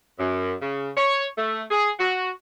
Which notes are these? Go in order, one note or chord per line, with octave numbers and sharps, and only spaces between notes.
F#2
C#3
C#5
A3
G#4
F#4